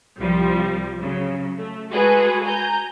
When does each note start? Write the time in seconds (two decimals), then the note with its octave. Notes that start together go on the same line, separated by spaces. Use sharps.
0.21 C2 F3 G3
1.00 C#3 F#3
1.57 A3
1.92 G#3 F#4 G#4 A4 B4
2.45 G#5 A#5 G6